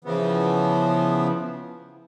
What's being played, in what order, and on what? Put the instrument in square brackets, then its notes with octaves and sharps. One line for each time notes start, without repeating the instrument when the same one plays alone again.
[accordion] C#3 E3 F3 B3